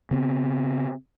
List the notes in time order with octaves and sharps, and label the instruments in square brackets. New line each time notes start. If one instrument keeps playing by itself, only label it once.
[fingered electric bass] C#3 B3 C4